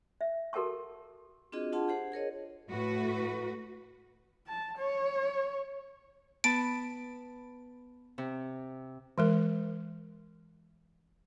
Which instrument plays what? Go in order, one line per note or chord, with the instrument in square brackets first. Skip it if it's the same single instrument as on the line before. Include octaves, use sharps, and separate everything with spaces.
[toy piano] E5
F#4 A4 A#4 F#5 A5 C#6
[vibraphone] C4 D4 F4 F#4 G#4 D#5
D4 F4 G#4 F#5 A5 C6
G4 G#4 C5 F#5
G#4 A#4 C#5 D#5
[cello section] A2 A3 F#4 B4
[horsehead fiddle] A5
C#5
[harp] B3 A5 B5 [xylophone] D7
[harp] C3
[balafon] E3 G#3 A#4